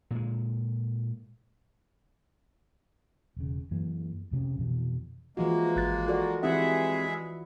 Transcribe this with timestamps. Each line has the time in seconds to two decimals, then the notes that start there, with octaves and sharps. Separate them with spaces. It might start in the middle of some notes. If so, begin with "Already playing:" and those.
0.11 A#2 G#3
3.37 E1 C#3
3.71 F#2 E3 A#3
4.31 F2 C3 C4 C#4
4.58 F2 B2 E3
5.37 E3 F3 G#3 A#3 F#4
5.76 G#1 F#6 A6
6.08 F#4 A4 D5
6.43 E3 G#3 C4 E4 G4 G#4 E5 F#5